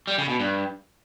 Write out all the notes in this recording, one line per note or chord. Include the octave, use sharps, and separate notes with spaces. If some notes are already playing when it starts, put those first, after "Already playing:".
G3
C#3
B2
G2